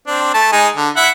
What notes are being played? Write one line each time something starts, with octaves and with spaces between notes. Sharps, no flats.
C4 D4
A3 A5
G#3 D#4 G#5
D3
E4 E5 F#5